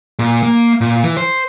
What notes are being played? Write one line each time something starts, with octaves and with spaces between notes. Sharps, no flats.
A#2
A#3
A#2
E3
C5